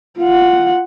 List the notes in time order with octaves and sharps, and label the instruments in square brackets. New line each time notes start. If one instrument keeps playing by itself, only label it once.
[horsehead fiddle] F4 F#5